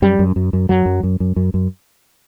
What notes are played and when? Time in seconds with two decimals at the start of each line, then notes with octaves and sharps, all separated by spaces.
0.02 F#2 G3
0.19 F#2
0.36 F#2
0.53 F#2
0.69 F#2 F#3
0.86 F#2
1.03 F#2
1.20 F#2
1.36 F#2
1.54 F#2